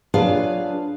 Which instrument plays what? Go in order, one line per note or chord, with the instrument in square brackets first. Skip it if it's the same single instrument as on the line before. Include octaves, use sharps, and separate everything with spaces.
[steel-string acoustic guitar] F#3 D4 F4 G#4 B4 F5